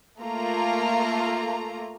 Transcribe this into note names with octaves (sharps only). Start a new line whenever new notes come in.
A3 A#3 F4 A#5